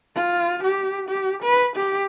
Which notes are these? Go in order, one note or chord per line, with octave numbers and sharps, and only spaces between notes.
F4
G4
G4
B4
G4